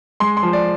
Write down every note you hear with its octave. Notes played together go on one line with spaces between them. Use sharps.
G#3 C6
C6
F3
D5